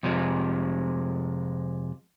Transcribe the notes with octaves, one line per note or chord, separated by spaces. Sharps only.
F2 C3 F3 G#3